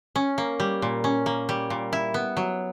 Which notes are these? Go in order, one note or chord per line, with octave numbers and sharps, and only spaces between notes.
C#4
A#3
G3
A#2
C#4
A#3
G3
A#2
E4
B3
F#3